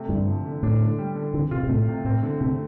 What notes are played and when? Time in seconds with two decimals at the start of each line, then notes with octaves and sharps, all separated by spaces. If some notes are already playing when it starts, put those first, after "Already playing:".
Already playing: C3 A3
0.08 G2 D3
0.27 F3
0.45 D3
0.63 A2 D4
0.81 D3
0.98 G3
1.15 D3
1.33 D3 C4
1.51 C3 F4
1.63 C3
1.69 A2 A3
1.88 C3
2.04 A2 C4
2.23 D3
2.40 C3 A3